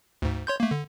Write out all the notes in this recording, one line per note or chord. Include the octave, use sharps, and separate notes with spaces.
D2 G#2
C#5 C6 G6
A3 A#3
D3